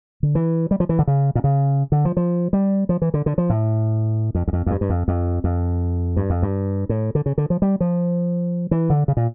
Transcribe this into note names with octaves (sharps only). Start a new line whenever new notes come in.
D3
E3
G3
F3
E3
D3
C#3
A#2
C#3
D3
F3
F3
G3
F3
E3
D3
D3
F3
A2
F2
E2
F2
F2
G2
G2
F2
F2
F2
G2
F2
G2
A2
D3
C#3
D3
F3
G3
F3
E3
D3
C#3
A#2